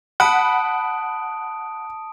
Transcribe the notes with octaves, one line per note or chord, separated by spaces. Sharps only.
F#5 A5 B5 D#6 D7